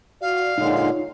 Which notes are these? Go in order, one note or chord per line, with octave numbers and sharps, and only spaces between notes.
F#4 D5 F5
A#2 D3 G#3 D#4 F4 C#5